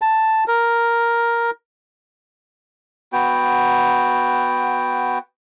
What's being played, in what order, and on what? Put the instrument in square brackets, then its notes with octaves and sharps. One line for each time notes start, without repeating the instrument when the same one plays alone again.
[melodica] A5
A#4
B3 F#4 G5